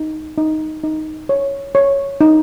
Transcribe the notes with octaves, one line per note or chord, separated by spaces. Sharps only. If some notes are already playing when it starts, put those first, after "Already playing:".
Already playing: D#4
D#4
D#4
C#5
C#5
D#4